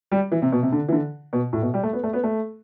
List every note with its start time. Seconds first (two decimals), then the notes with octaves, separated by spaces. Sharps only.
0.12 G3
0.32 E3
0.42 C3
0.52 B2
0.63 C3
0.72 D3
0.88 E3
0.92 D3
1.33 B2
1.53 A2
1.62 B2
1.74 G3
1.83 A3
1.93 B3
2.03 A3
2.13 B3
2.23 A3